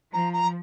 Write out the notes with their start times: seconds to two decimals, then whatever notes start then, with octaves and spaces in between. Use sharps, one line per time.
0.13 F3 A#5
0.33 A#5